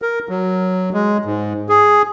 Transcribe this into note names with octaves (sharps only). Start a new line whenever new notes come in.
A#4
F#3
G#3
G#2
G#4